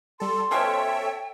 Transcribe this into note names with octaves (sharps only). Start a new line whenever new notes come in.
G3 A4 C6
B2 F3 C#4 A4 C#5 E5 G5